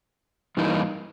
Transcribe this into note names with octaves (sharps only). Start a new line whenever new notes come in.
G2 E3 A#3 D#4